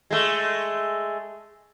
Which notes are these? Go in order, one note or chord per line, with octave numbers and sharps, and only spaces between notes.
G#3 A3